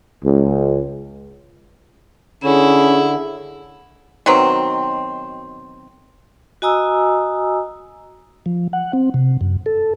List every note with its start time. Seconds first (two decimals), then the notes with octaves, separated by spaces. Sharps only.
0.23 C#2
2.44 D3 C#4 E4 G#4
4.26 B2 D#3 F#3 C4
6.62 F#4 D#5 G#5 A#5 D#6 E6
8.46 F3
8.73 F#5
8.93 C4
9.14 C3
9.41 F#2
9.66 A4